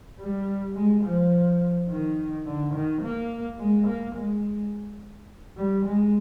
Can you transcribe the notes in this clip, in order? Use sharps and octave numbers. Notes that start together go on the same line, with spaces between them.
G3
G#3
F3
D#3
D3
D#3
A#3
G#3
A#3
G#3
G3
G#3